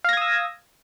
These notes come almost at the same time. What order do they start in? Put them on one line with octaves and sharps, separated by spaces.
F5 A#6 G#6 D#6 E6